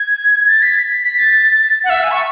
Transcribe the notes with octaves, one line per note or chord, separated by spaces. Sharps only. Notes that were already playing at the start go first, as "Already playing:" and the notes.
Already playing: G#6
A6
B6
B6
A6
F#5
E5
G#5
C#6